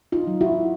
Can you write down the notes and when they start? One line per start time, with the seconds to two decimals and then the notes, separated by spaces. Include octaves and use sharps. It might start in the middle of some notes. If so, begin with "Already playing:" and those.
0.12 D#4 F4
0.27 F#3
0.41 E4 F#4